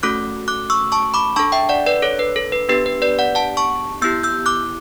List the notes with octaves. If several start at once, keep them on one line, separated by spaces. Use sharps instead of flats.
A3 C#4 F#4 A4 D6 F#6
D6 F#6
C#6 E6
A5 C#6
B5 D6
D4 A4 A5 C#6
E5 G5
D5 F#5
B4 D5
A4 C#5
B4
A4
B4
B3 D4 G4 B4
B4
B4 D5
D5 F#5
F#5 A5
A5 C#6
B3 E4 G4 E6 G6
E6 G6
D6 F#6